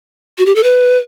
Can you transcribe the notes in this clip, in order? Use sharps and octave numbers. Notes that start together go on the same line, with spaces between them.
F#4
G4
A4
B4